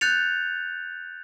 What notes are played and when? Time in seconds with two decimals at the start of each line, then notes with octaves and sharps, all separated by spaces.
0.01 F#6 G6 A6 C#7 F7